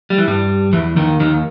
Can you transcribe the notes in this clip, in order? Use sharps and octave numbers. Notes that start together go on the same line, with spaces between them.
G3
E3
G2 G3
E2 E3
D#2 D#3
D#2 D#3